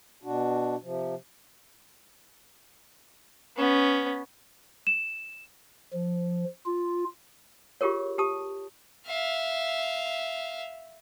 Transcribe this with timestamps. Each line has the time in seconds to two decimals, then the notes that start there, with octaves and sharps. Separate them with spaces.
0.23 B2 D4 F#4
0.83 C3 F3
3.57 B3 C#4
4.87 E7
5.94 F3
6.66 F4
7.81 F4 G4 G#4 A#4 C#5
8.18 G4 A5 D#6
9.06 E5 F5